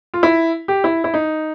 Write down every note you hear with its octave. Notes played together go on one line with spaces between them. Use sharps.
F4
E4
G4
E4
E4
D#4